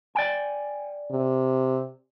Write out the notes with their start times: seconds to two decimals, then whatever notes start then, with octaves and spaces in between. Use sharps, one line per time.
0.15 D5 G5 G#5
1.11 C3